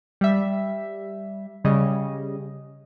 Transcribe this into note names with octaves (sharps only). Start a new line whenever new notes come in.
G3 E5
C#3 G3 D#5